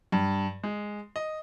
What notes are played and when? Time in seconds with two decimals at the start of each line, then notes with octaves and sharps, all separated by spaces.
0.12 G2
0.63 G#3
1.16 D#5